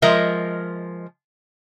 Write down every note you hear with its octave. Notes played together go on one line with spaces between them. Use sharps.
F3 G#3 A#4 D#5 E5